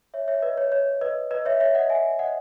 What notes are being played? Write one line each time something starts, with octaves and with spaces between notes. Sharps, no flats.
C#5 E5
C#5 E5
B4 D#5
C#5
C#5
B4 D#5
B4 D#5
C#5 E5
C#5 E5
D#5 F#5
E5 G#5
D#5 F#5